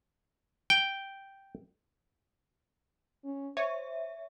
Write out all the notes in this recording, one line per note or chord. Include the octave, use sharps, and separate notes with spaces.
G5
C#4
C5 C#5 E5